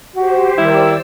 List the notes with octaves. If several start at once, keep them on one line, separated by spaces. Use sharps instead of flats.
F#4 G4 C5
D#3 G3 E4 D5 E6